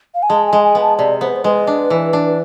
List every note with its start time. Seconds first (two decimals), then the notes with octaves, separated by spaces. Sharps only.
0.14 F5
0.22 G#5
0.29 G#3 A5
0.47 G#5
0.53 G#3
0.64 G#5
0.75 B3
0.82 A5
0.98 C3 D5
1.21 B3 C5
1.28 B4
1.36 C5
1.44 G#3 B4
1.67 D4
1.90 E3
2.13 D4